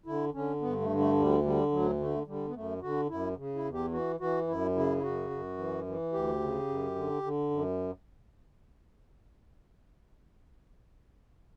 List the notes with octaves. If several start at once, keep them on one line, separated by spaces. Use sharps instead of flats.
D3 E4
D3 C#4
G2 B3
A3
D3
A3
D2 G3
D3 G3
D2 F#3
D3 A3
D3 G3
B3
F#2 A3
D3 F#4
F#2 E4
C#3
E4
E2
G4
E3 F#4
E3 F#4
F#2 E4
C#3 E4
E4
F#2 F#4
F#2
E3
E3
D2 G4
C#3
F#2
D3
D3
F#2